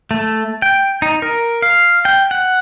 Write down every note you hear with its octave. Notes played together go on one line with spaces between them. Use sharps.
A3
G5
D#4
A#4
F5
G5
F#5